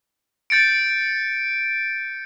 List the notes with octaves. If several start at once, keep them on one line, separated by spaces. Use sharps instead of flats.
G6 A6 C#7 D7